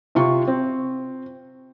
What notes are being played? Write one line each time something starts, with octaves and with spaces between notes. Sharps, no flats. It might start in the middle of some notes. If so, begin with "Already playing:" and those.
C3 F4 C#6
C4